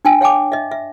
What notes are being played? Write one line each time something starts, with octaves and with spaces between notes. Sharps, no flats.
D4 G5 G#5
C#5 F5 G5 G#5 D6
D#5 E5
E5